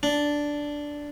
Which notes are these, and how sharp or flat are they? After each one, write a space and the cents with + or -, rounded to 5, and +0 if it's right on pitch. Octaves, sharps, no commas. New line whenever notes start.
D4 -5